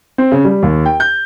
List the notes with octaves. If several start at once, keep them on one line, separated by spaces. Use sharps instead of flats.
C4
C#3
G3
D#2
G5
G6